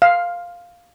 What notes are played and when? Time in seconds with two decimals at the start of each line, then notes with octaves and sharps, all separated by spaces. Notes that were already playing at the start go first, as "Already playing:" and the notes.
0.02 F5